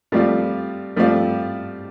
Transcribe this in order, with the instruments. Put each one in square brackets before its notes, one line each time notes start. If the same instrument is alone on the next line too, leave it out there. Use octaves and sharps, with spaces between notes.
[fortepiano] F3 A3 [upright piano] G3 C4 F4 D5 F5
[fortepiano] F3 A3 [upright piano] G3 C4 F4 D5 F5